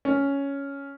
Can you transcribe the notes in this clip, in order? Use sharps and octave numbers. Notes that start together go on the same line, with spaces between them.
C#4